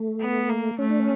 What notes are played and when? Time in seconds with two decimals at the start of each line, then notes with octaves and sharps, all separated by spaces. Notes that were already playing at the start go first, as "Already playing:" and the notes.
Already playing: A3
0.21 B3
0.50 A#3
0.79 A3 C#4
0.90 D4
1.00 C#4